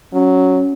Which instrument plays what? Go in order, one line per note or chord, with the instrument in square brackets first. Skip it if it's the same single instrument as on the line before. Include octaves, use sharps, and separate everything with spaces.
[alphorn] F#3 [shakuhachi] C#4